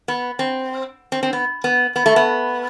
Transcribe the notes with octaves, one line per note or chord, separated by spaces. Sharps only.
B3
C4
C4
C4
B3
B3
B3
A3
B3